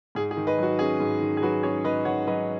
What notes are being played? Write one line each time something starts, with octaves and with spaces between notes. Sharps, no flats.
G#2 G#4
G#4
D#3
B4 D#5
F#3 F#4
C#4 G#4
G#2
D#3
G#4
F#3 F#4 B4
C#4 G#4 C#5
G#2 B4 D#5
D#3 C#5 F#5
F#3 B4 D#5